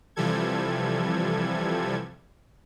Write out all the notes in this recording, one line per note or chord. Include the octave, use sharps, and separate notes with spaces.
C3 E3 F3 G3 A4 G#6